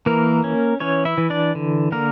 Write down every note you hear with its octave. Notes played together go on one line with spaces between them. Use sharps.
E3 A#3 A#4
C#4
E3 C#4 C#5
E4 E5
E3
D4 D5
D3
D3 A#3 A#4